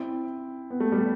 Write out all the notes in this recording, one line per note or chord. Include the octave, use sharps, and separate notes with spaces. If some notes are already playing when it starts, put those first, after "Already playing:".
Already playing: C4 E4
B3
A3
G3